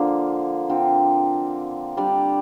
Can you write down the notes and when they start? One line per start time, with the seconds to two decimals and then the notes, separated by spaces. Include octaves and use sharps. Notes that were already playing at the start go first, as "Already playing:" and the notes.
Already playing: D3 F3 A#3 D4
0.69 D3 F3 C4
1.97 G3 D4 G4 D5